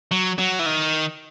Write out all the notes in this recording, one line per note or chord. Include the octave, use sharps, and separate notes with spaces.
F#3
F#3
E3
D#3